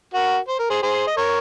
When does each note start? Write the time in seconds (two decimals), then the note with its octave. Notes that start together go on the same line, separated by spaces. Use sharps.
0.14 F#4 A#4
0.48 C5
0.59 A#4
0.70 G#4 C5
0.82 G#4 C5
1.07 D#5
1.17 A#4 C#5